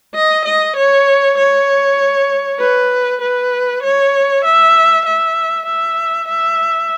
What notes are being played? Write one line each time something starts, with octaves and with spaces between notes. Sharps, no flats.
D#5
D#5
C#5
C#5
B4
B4
C#5
E5
E5
E5
E5